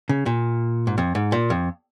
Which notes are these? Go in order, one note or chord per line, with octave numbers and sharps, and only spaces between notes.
C#3
A#2
G#2
F2
G#2
A#2
F2